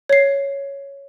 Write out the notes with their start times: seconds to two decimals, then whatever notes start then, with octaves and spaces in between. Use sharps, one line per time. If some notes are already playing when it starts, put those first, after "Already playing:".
0.09 C#5 C7